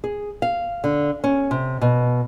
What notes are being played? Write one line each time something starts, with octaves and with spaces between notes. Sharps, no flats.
G#4
F5
D3
C#4
C3
B2